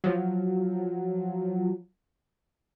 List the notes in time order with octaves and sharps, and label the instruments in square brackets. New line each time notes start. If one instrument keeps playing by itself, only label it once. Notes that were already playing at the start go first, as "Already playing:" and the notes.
[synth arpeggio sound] F3 F#3